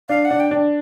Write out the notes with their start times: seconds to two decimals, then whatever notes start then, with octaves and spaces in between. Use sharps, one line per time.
0.09 D4 F5
0.25 F#5
0.31 D4
0.40 G5
0.51 D4